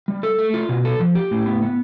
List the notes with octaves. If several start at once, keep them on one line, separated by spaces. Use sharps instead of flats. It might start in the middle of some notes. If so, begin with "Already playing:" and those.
G3
A4
A3
F4
B2
A4
F3
G4
A2
B3
B3